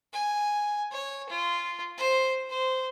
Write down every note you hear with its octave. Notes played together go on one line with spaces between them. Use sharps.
G#5
C#5
F4
C5
C5